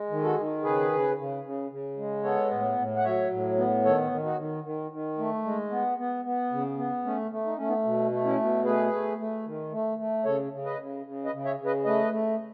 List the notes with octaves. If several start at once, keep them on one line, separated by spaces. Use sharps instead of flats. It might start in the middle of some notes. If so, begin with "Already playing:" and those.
Already playing: G#3
D#3
F#4 A4
D#3
C#3 G#4 B4
C#3
C#3
C#3
C#3
G#3
B3 A4 C#5
A2
A2
F#5
F#3 C#5 E5
A2
B3
D#3 A4 C#5
D#3
D#4 F#4
D#3
D#3
D#3
A3
G#3
B3
B3
B3
C#3
B3
A3 C#4
A3
D#4
A3 C#4
B3 D#4
B2
A3
C#4 E4
B2
A3 G#4 B4
A3
A3
D#3
A3
A3
C#3 A4 C#5
C#3
B4 D#5
C#3
C#3
B4 D#5
C#3
C#5 E5
C#3
B4 D#5
A3 B4 D#5
A3